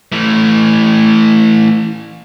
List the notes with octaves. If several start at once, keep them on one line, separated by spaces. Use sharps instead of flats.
E3 A3